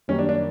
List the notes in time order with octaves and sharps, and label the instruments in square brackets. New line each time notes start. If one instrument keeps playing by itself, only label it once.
[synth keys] F#2 D#3 G3 A#3 [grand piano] C#4
[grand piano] D4
D4